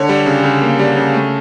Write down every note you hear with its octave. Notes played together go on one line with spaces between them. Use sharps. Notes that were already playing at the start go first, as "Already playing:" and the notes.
Already playing: D3 C#5
G3
C#3
C#3
A#3
G3
C#3
A3